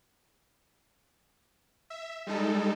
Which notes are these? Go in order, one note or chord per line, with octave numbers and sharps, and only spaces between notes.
E5
G3 G#3 D#4 A4